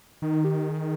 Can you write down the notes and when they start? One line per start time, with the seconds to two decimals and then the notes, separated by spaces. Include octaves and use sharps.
0.22 D#3 D#4
0.45 G4
0.69 G#4